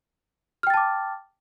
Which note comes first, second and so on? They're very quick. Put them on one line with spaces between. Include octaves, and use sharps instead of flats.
F6 G5 A6 A5 D6